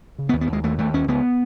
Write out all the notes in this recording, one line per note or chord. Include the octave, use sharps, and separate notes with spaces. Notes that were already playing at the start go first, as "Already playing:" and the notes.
C#3
B3
D#2
B3
D#2 G#3
D#2 A3
D#2 A3
D#2 C#4
C#2 B3